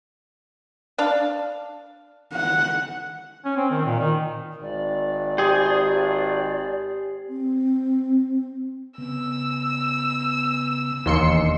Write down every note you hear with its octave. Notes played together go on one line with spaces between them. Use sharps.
D4 F5
F#5
C#4
C4
D#3
A#2
D#3
G#1 D5
G4 G#4 C5
C4
C#3 B3 E6
E1 D#2 C6 C#7